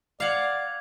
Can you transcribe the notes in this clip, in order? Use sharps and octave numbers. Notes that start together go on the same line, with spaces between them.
D5 F5 F#5 D6 G#6 F7